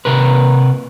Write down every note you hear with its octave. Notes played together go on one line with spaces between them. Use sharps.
C3 A#4 B4